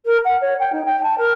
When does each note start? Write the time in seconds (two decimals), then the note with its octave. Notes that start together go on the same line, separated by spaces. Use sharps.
0.05 A#4
0.24 F#5
0.41 C#5
0.59 G5
0.72 D#4
0.85 G5
1.03 A5
1.18 A#4